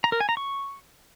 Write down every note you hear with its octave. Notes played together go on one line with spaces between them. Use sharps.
A#5
A#4
G#5
A#5
C#6